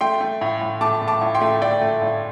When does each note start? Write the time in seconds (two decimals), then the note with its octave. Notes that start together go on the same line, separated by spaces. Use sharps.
0.01 A3 G5 C6
0.21 A3
0.41 A2
0.61 A2
0.81 A3 A5 D6
1.01 A3
1.08 A5 D6
1.21 A2
1.35 G5 C6
1.41 A3
1.62 A3 D5 G5
1.81 A3
2.02 A2